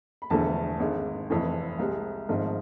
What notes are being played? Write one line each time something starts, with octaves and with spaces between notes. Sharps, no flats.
B5
E1 E2 D3 F3 A3 A5
G#1 G#2 G#3
F1 F2 E3 A3
C2 C3 G#3
G#1 G#2 F3 A3 F5